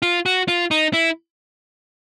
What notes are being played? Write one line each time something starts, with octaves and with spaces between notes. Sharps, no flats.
F4
F#4
F4
D#4
E4